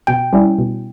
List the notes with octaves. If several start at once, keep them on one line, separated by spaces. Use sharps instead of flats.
B2 G5
G3 C#4 E4
B2